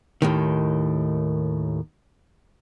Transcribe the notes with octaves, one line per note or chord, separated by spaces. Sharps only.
D#2 A2 D#3